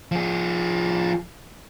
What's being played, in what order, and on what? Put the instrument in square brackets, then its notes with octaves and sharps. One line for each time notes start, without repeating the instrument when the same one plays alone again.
[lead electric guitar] F3 G#4